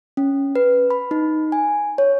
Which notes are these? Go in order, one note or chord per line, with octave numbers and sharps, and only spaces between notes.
C#4
B4
B5
D#4
G#5
C#5